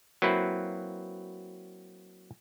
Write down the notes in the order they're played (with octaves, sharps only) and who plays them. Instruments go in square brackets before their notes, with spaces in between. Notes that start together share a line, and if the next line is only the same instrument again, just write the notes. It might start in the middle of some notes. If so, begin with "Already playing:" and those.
[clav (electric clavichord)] F#3 A#3 C4 E4 B4